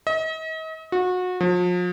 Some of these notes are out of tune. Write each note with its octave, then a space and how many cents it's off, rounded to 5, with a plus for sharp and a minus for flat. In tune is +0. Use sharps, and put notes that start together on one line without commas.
D#5 +40
F#4 -25
F3 +40